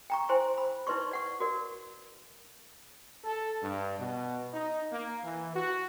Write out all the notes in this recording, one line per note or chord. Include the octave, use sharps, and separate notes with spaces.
G5 A#5 C#6
E4 C5 G5 G#5 A#5 C6
B5
D#4 E4 B4 D5 C6 C#6
D5 F#5 C#6
F#4 A#4 D5
A4
G2
B2
D#4
A#3
E3
F#4